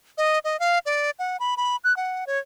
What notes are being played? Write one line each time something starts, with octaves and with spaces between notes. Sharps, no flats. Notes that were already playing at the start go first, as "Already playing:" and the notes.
D#5
D#5
F5
D5
F#5
B5
B5
F#6
F#5
C#5